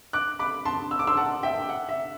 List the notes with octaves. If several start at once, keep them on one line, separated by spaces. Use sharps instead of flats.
D6 F#6
B5 D6
A5 C6
E6
D6
C6 E6
F#5 A5
E5 G5
F#5
E5